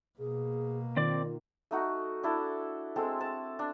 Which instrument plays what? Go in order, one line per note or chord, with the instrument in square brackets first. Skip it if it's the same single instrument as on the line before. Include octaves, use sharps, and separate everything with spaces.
[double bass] B2 A#3 [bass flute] G#4
[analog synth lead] D#3 [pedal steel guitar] C4 D5 D6 [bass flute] F4
[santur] A3 D#4 F#4
D4 E4 A4
G#3 C4 A4
A5
D4